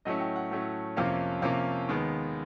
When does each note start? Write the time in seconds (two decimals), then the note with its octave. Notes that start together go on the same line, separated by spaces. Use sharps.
0.05 A2 F#3 A3 C#4 D#5
0.20 G5
0.36 F#5
0.51 A2 F#3 A3 C#4
0.97 F2 C3 F3 A#3 C#4 F5
1.42 F2 C3 F3 A#3 C#4 F5
1.88 D#2 D#3 G#3 B3